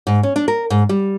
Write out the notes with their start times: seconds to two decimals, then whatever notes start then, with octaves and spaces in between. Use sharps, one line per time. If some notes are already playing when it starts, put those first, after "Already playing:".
0.07 G#2
0.23 C#4
0.36 D4
0.48 A#4
0.70 G#2
0.89 G3